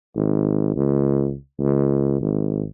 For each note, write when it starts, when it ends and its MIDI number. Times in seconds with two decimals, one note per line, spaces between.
0.16 0.72 32
0.76 1.34 37
1.59 2.16 37
2.21 2.65 32